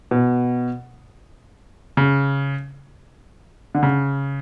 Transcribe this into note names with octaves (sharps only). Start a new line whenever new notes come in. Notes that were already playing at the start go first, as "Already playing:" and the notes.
B2
C#3
D3
C#3